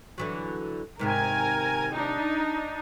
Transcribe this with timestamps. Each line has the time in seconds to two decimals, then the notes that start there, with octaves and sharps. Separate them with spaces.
0.18 D3 E3 F#3
0.99 G#2 C3 D#3 A#4 G#5
1.91 D4 D#4